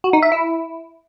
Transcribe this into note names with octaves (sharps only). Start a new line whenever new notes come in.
F#4
D#4
E5
E4